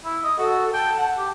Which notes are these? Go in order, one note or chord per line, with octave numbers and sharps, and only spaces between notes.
E4
D#5
F#4 A4
G5 A5
F#5
G4